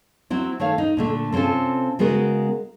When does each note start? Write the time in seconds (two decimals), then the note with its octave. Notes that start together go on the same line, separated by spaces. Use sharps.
0.30 F#3 C4 E4
0.60 D#3 A3 C#5 F5
0.78 D#4
0.97 A#2 D3 A3
1.32 C3 C4 C#4 F4 A4
1.99 C#3 G#3 B3 F#4 A#4